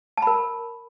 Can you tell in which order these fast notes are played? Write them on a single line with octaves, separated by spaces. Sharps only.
A5 B5 A#4